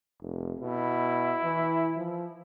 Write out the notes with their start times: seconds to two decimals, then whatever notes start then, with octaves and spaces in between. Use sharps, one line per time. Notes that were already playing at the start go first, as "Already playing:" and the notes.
0.21 F1
0.60 B2 E4
1.44 E3
1.96 F3